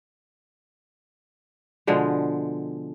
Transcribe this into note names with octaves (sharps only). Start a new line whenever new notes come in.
B2 D3 F3 G#3